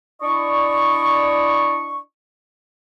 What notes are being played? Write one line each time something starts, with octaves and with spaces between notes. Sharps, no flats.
D4 E4 D5 D#5 C#6